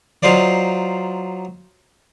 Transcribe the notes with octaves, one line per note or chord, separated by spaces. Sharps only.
F#3 D#4 F4 C5 D5